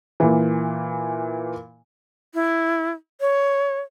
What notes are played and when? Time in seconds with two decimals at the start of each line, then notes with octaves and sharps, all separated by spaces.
0.20 A#2 E3
2.34 E4
3.21 C#5